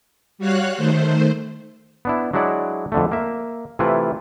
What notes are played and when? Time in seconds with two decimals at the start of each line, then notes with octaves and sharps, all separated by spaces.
0.38 G3 F#4 C#5 F5 F#6
0.76 D#3 A3 C5
2.05 B3 D4 E4
2.33 F#3 G#3 D4 E4 D5 F#5
2.92 F2 D3 A3
3.12 A#3 E5
3.79 C3 E3 A3 E4 F4 B4